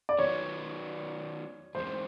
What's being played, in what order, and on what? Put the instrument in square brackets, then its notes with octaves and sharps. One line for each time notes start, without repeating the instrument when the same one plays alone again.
[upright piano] D5
[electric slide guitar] D#3 F#3 B3 [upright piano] C#5
[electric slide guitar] G#2 E3 G#3 [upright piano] C5